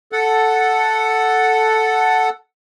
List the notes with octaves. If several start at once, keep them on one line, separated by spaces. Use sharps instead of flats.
A4 F#5